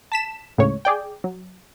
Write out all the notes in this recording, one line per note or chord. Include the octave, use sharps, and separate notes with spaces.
A5 B6 E7
D2 A2 C#3 G#3 C#5
G#4 D5 G5
F#3